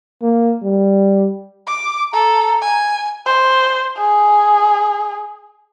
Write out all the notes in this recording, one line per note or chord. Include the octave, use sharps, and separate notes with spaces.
A#3
G3
D6
A4 A#5
G#5
C5
G#4